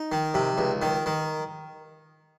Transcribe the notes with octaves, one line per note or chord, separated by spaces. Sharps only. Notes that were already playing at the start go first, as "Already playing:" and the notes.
Already playing: D#4
D#3
C3
C#2
D#3
D#3